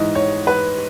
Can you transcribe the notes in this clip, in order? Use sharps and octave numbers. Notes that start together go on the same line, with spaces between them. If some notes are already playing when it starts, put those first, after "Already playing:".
Already playing: G#2 E3 D#5
C#5
B4